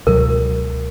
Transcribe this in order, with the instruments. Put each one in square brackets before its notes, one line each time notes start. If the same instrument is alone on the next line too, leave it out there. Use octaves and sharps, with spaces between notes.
[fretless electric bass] C#2 B2 F#3 [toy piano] A#4